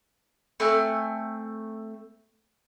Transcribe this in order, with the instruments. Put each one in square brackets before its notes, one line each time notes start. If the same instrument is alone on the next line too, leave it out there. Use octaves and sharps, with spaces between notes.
[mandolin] A3 C4 G#5 F#6